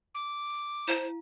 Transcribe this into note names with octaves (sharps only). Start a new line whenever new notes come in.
D6
E4 C5 F5 A5